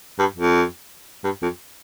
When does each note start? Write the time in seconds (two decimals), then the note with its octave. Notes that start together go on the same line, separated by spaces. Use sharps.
0.19 G2
0.36 F2
1.24 G2
1.42 F2